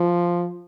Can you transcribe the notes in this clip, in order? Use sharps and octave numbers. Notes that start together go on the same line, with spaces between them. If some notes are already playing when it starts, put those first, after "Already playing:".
Already playing: F3